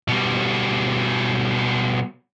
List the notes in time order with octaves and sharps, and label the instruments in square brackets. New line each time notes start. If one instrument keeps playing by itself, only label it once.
[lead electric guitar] B2 G3